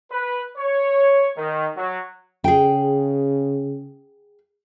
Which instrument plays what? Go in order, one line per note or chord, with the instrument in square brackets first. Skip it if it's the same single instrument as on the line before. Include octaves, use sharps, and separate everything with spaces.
[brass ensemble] B4
C#5
D#3
F#3
[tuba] C#3 [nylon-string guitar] G#4 G5